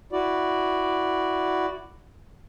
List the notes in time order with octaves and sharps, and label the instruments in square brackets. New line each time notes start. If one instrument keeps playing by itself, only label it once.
[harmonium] E4 F#4 D5